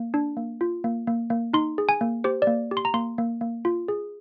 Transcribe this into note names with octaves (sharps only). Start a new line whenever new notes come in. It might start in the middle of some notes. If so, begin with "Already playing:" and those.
Already playing: A#3
D4
A#3
F4
A#3
A#3
A#3
D#4 C6
G#4
G#5
A#3
G4 C5
D5
A#3
G4
C6
A#5
A#3 C6
A#3
A#3
F4
G#4